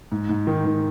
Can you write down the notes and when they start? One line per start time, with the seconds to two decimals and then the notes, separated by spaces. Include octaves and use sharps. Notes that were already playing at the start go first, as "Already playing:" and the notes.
0.12 G#2
0.29 G#2
0.47 D#3
0.66 D#3